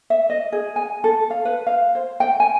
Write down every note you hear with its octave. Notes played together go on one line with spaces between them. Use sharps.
E5
D#5
G#4
G#5
A4
F5
B4
F5
C5
G5
G#5